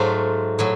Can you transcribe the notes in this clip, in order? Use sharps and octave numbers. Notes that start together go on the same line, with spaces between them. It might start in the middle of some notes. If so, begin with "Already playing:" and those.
Already playing: G#2 F#3 A3 F4
A2 F#3